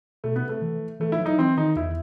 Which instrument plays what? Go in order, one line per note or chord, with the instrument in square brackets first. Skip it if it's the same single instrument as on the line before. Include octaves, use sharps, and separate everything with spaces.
[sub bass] B2 [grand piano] A3
[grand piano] B3
[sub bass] C3
[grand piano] A3
[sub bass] E3
[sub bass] E3 [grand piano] A3
[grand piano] E4
[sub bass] F#3
[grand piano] D#4
[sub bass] E3 [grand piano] C4
[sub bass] D#3 [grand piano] D#4
[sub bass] E2 [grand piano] E4